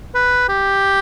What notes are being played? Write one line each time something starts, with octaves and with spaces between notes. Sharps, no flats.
B4
G4